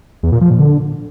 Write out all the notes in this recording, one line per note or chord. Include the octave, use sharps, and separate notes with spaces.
E2
A#2
F3
A#2
D3